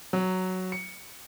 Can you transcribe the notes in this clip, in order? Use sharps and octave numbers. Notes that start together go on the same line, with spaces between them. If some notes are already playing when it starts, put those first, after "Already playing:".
F#3
C#7